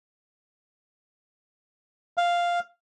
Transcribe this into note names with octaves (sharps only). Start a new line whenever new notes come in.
F5